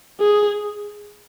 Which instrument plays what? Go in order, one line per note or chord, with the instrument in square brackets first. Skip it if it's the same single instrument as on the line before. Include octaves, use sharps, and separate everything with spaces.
[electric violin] G#4